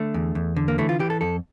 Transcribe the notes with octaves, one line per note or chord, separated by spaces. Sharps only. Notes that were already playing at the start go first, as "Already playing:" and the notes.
Already playing: D3 A3
E2
E2
D3
A#3
E3 A3
F4
E3 G4
A4
F2 A4